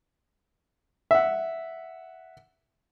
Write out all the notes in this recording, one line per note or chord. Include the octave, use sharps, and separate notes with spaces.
E5 F#5